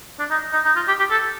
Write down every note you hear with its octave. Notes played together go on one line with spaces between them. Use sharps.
D4
D#4
D#4
D#4
F4
G4
G4
A4